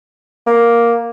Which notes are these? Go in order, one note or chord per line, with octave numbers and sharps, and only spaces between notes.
A#3